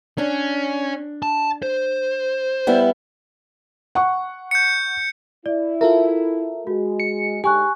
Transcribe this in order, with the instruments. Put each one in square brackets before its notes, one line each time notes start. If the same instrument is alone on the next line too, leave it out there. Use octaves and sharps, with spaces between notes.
[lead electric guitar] C#4 [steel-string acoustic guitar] D4
[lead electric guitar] A5
C5
[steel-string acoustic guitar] G3 B3 E4
[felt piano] F#5 C#6
[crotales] G6 C#7
[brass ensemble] E4 [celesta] D5
[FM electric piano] F4 A4 A#4 [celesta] E5
[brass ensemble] G#3 [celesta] F#4
[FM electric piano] C#7
[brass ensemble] G#2 D3 G#3 [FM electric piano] G4 [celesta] G#5 C#6 F#6